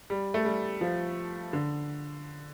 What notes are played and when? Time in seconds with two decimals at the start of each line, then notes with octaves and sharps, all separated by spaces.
0.10 G3
0.34 A3
0.45 G3
0.81 F3
1.53 D3